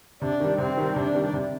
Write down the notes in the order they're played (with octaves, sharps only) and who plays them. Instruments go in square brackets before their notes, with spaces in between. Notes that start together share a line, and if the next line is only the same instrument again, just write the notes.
[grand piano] C3 [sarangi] D4
[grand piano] D#3 G3
[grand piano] C3 [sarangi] C4
[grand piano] D#3 G3
[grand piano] C3 [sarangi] D4
[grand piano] D#3 G3
C3